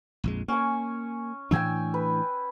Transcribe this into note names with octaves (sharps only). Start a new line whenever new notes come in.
A#1 F2 G#3
A#3 C#4 G#5 C#6
A2 E3 D4 G5 G#5 E6
B4